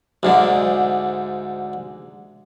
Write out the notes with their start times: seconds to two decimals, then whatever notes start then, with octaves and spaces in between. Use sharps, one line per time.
0.23 D2 G#2 D3